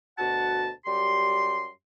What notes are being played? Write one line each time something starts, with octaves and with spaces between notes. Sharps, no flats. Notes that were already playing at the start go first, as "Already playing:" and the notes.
D2 B2 F#4 F#5 A5
F#2 G3 G4 C6